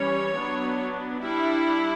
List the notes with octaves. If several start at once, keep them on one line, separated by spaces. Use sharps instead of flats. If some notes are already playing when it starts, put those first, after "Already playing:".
Already playing: E3 G3 C#4 C#5
F#3 B3 D4
G3 D4 E4